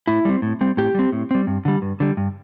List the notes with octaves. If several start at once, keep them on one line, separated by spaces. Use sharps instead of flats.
A2 E4
G3 C4
A2
G3 C4
A2 G4
G3 C4
A2
G3 C4
G2
D3 G3
G2
D3 G3
G2